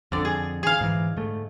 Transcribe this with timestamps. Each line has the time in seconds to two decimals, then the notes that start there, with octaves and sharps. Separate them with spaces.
0.12 F2 D3 D5
0.25 G#4
0.63 G#4 F5
0.81 G#2 E3
1.16 G#2 A3